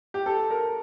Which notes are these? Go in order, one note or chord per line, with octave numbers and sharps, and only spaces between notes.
G4
A4
A#4